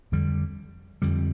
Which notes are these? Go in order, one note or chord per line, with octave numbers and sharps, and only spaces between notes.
F2 D3 G3
F2 D3 G3